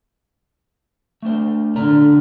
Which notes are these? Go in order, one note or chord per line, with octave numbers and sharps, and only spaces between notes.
A3 D4 C5
D3 A#4 D5 A#5